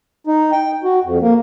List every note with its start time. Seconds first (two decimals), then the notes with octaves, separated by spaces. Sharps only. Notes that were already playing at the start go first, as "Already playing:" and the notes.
0.27 D#4
0.52 G5
0.84 F#4
1.04 F2
1.21 A#3